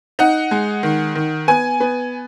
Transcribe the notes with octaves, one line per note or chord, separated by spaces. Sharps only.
D#4 F#5
G#3
D#3
D#3
B3 G#5
B3